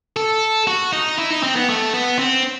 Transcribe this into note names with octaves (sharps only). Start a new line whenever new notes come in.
A4
F#4
D#4
E4
D#4
C4
B3
A3
B3
C4